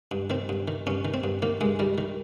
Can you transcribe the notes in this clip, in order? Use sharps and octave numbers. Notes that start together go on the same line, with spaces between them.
G2
D#3 C4
G2
D#3
G2 C#4
D#3
C4
G2
D#3 A#3
G2 G#3
D#3 G3
D#3